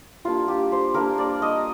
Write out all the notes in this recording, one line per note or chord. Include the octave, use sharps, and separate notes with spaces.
G3 A#3 D4 F4
G4
C5
G3 A#3 D4 A#4
D5
D#5